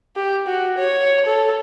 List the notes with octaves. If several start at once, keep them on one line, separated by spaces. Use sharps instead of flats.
G4
F#4
C#5
A4